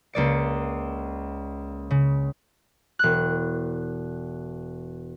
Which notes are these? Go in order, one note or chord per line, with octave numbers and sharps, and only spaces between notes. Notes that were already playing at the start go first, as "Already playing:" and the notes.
C#2 A#3 D5 C#7
C#3
E1 F#6